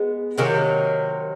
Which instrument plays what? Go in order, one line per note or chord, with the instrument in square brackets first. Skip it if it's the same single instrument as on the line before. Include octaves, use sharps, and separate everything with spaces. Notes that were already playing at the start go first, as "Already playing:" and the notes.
Already playing: [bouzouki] G#3 B3
C3 D#3 F#3 A#3